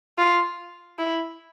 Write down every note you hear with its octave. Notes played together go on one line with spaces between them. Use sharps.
F4
E4